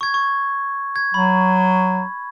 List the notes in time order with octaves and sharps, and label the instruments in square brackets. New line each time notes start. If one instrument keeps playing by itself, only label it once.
[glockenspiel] C#6 G#6
C#6
G#6
[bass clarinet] F#3 [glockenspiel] B5